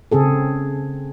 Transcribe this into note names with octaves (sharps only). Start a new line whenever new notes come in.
C#3 C4 G#4 A4